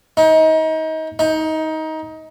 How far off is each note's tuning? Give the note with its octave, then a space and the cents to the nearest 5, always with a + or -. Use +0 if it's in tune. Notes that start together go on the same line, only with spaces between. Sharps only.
D#4 +30
D#4 +20